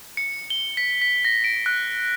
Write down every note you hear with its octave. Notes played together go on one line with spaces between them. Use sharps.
C#7
G7
B6
B6
A#6
D7
F#6